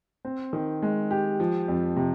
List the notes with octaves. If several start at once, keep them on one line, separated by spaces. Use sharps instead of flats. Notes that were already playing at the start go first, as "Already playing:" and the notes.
C4
D#3
G#3
G4
F3
F2
C3